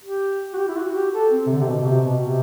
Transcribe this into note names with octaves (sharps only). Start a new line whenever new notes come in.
G4
F#4
G4
E4
F#4
G4
A4
C4
C3
D3
C3
B2
B2
C3
B2
C3